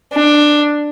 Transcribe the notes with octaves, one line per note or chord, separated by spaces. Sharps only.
D4